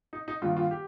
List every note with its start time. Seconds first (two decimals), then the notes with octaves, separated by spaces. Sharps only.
0.13 D#4
0.28 D#4
0.42 G2 D#3 G3 A#3 F4
0.57 F4
0.71 G4